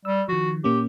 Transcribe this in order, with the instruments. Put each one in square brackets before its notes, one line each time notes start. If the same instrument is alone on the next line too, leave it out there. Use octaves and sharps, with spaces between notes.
[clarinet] G3 [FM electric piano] E6
[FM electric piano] D#3 F3 [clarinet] F#4
[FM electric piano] A#2 A#3 C#4 [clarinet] G4